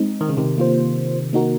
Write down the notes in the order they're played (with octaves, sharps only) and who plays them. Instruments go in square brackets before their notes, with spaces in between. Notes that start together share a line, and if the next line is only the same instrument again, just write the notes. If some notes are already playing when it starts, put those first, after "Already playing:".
Already playing: [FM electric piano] G#3 C4 D#4
[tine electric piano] D#3
C#3
C3 D#3
[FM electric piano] A#3 F4 C5
A#3 D#4 F#4 A#4